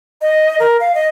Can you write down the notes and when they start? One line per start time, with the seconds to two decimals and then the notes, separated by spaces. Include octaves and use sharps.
0.21 D#5
0.59 A#4
0.80 F5
0.95 D#5